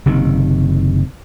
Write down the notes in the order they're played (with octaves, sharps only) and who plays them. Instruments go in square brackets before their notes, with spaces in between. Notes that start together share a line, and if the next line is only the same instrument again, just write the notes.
[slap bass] F#1 C3 D#3